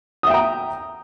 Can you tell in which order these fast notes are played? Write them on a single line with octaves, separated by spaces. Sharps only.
D#6 E5 G5 A#5